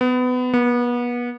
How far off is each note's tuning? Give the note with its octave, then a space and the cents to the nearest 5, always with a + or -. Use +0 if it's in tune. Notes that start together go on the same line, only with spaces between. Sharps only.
B3 +25
B3 -30